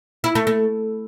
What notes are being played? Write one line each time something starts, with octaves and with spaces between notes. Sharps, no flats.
E4
A3
A3